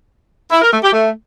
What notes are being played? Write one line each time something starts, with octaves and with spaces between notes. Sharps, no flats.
E4
A#4
A3
G4
A3